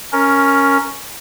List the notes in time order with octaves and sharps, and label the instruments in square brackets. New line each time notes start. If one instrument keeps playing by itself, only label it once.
[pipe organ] C#4 A#4